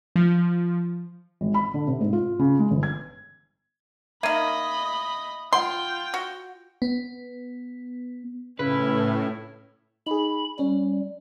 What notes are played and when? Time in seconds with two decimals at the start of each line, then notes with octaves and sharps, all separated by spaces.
0.16 F3
1.41 G#1
1.54 B5
1.74 D3
1.87 C3
2.00 G#2
2.13 F4
2.39 C#3
2.59 G#3
2.71 G1
2.83 G#6
4.23 D#3 A#3 D#5 E5 B5 G#6 D#7
5.53 F4 F#5 G5 B5 C6
6.14 F#4
6.82 B3
8.59 A2 C#3 C#4 E4 B4
10.06 D#4 G#4 B5
10.59 G3 C#4